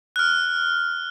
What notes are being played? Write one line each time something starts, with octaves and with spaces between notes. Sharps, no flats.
F6 F#6